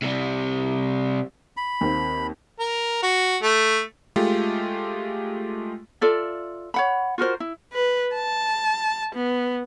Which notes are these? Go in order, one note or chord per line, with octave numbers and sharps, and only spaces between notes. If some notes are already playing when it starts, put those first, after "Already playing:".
C3 G3
B5
D#2 A#3 C4
A#4
F#4
A3
G#3 A3 F4 G4
F4 A4 D5 E5
C#5 F#5 B5
F4 F#4 A#4 C5
E4
B4
A5
B3